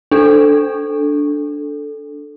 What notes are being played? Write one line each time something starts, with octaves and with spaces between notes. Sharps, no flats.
D4 A4